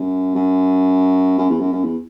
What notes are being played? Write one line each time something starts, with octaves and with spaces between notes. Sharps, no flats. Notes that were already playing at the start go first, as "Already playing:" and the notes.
Already playing: F#2
F#2
F#2
E2
F#2
F#2
E2